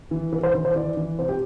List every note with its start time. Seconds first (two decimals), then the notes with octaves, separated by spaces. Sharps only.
0.11 E3
0.33 E3 B4
0.43 C5
0.55 E3
0.65 C5
0.76 E3 D5
0.97 E3
1.19 C3 C5
1.29 G4